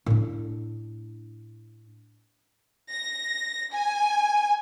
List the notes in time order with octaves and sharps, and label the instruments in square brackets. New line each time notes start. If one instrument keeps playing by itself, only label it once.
[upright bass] A2 D4
[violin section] A#6
G#5